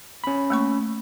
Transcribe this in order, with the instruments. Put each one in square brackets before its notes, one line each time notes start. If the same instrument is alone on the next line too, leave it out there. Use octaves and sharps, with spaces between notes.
[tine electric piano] C#4 B5
[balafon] A3 A#3 C#6